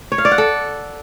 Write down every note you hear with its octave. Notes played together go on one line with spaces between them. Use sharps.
C#5
F5
D5
F#5
A4